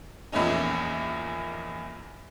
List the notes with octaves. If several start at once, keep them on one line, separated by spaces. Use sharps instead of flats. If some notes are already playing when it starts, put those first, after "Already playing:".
A#1 E2 A#2 A3 C#4 D#4